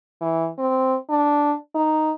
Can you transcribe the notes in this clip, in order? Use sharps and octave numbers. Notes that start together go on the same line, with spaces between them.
E3
C4
D4
D#4